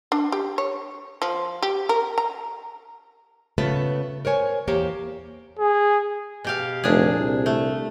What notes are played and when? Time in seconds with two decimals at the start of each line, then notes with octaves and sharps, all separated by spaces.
0.12 D4
0.32 G4
0.58 C#5
1.22 F3
1.63 G4
1.89 A#4
2.18 A#5
3.58 C#3 A3 B3 F4 A4 B4
4.25 A#4 C5 C#5 G#5
4.68 E2 A#3 G4 C5 C#5
5.59 G#4
6.44 B2 G4 F5
6.84 F1 A#2 D4 G#4
7.16 C2
7.46 A3